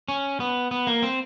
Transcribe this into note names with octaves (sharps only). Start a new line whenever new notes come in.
C#4
B3
B3
A#3
C4